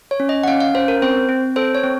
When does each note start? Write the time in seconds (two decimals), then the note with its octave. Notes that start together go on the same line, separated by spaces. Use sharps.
0.11 C#5
0.20 C#4
0.29 D#5
0.43 F#5
0.48 C#4 F5
0.60 F5
0.75 C#4 C5
0.88 A#4
1.02 C4 C5
1.29 C4
1.56 A4 C5
1.75 C#5
1.84 C4